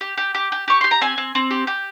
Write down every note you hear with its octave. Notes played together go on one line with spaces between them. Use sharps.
G4
G4
G4
G4
G4 C#6
G4 C6
A#5
C4 G#5
C4
C4
G4
G4